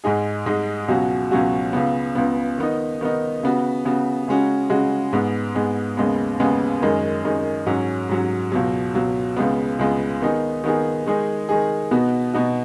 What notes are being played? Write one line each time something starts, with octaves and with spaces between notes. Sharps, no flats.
G#2 G#3 D#4 G#4
G#2 G#3 D#4 G#4
C#2 B2 F#3 C#4 F#4
C#2 B2 F#3 C#4 F#4
C#2 C#3 B3
C#2 C#3 B3
D#3 B3 D#4
D#3 B3 D#4
C#3 B3 F#4
C#3 B3 F#4
C#3 G#3 C#4 F#4
C#3 G#3 C#4 F#4
G#2 G#3 B3
G#2 G#3 B3
D#2 C#3 G#3 B3
D#2 C#3 G#3 B3
F#2 D#3 G#3 D#4
F#2 D#3 G#3 D#4
G#2 F#3 C#4
G#2 F#3 C#4
C#2 B2 F#3
C#2 B2 F#3
C#2 C#3 G#3 B3
C#2 C#3 G#3 B3
D#3 B3 D#4 G#4
D#3 B3 D#4 G#4
D#3 G#3 D#4 G#4
D#3 G#3 D#4 G#4
B2 B3 D#4 F#4
B2 B3 D#4 F#4